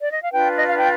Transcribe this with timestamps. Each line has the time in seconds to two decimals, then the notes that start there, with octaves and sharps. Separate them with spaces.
0.01 D5
0.11 D#5
0.21 F5
0.31 D4 F4 B4 G5
0.56 D#5
0.66 F5
0.77 G5